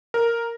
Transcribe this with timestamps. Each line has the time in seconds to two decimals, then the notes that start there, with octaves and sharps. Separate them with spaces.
0.14 A#4